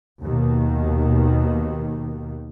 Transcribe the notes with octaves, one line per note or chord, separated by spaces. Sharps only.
D#2 B2 D#3